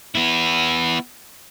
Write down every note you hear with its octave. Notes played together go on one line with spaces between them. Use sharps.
B3 E4